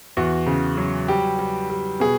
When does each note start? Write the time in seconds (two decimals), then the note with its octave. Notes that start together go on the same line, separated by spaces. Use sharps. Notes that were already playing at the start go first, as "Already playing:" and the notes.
0.17 E2 F#4
0.46 C#3
0.77 F#3
1.08 G3 G4
1.39 G3
1.70 G3
2.00 B2 G#4